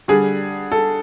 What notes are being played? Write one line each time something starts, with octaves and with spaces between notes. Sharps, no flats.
D3 G3 G#4
A4